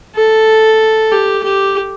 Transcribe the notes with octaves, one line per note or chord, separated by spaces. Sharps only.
A4
G4
G4